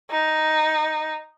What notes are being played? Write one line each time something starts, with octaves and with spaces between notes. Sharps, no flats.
D#4